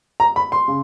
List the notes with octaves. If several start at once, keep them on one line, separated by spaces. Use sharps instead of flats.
A#5
B5
C6
C#3